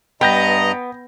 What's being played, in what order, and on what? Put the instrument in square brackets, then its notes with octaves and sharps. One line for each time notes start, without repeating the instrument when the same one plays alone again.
[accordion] G2 D#5 A#5 [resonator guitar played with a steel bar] B3 [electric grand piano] G5 G6 A#6